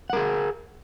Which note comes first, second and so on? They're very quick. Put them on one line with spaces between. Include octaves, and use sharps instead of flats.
F#5 A#4 G#4